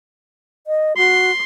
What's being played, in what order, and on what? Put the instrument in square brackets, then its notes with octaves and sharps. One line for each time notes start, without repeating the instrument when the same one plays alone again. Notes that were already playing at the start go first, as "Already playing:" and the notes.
[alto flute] D#5
[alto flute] F#4 [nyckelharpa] C6